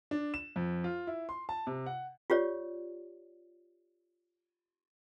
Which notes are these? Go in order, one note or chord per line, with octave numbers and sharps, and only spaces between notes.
D4
E7
F2
F4
E4
C6
A5
C3
F#5
F4 G4 C#5 D5